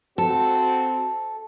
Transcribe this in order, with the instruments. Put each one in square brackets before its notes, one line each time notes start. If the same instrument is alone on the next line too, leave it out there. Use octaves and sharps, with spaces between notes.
[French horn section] C4 F#4 [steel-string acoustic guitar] A4